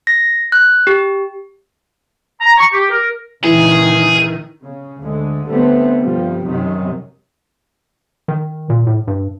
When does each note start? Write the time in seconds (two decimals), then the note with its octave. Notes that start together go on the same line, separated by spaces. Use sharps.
0.07 A#6
0.52 F#6
0.87 G4
2.40 A#5
2.58 C#6
2.73 G4
2.90 A#4
3.44 C#2 A#2 D#3 E3 G#4
4.62 C#3
4.97 D2 D3 G#3
5.47 D3 G3 A3 B3 C4
6.00 G2 C3 F3 G3
6.45 C2 F#2 C3 D#3
8.28 D#3
8.70 A#2
8.87 A2
9.08 G2